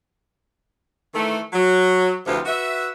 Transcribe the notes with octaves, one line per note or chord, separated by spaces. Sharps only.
D#3 E3 A3
F#3
D2 C3 E3 F3 G4
F#4 B4 E5